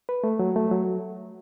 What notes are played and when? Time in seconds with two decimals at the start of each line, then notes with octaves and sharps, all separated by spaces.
0.09 B4
0.24 A3
0.39 F#3
0.56 A3
0.71 F#3